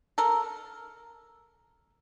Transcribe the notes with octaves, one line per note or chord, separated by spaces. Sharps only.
A4 A#4